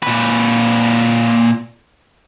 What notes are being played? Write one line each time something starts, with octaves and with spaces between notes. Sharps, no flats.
A#2 B4